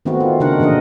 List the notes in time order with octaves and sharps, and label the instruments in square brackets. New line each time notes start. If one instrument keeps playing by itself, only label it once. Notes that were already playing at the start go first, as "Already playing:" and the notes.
[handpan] D#3 A3 B3 C4 D#4 F#4
F4
C#3 D4 D#4 F#4 A#4 F#5
A#2 E3 D4 A#4 D#5